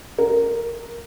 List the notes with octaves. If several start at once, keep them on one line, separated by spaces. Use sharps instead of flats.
A#4